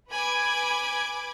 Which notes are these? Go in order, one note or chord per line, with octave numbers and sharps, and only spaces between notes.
B4 G#5 B5 D6 G#6